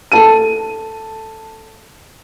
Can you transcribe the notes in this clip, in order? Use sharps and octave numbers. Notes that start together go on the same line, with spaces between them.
A4 A5 D#7